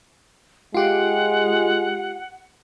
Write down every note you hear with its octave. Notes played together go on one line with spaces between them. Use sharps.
G#3 F4 G4 F#5